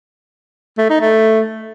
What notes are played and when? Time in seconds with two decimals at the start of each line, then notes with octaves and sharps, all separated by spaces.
0.78 A3
0.89 D#4
1.01 A3